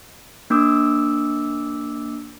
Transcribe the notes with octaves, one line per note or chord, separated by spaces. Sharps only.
A#3 D4 D6 E6